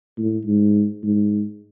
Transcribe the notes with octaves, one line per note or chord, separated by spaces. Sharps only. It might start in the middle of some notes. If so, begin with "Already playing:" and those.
A2
G#2
G#2